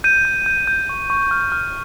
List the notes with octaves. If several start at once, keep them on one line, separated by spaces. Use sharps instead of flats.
G6 D#7
G6
G6
G6
C#6
C#6
F6
F6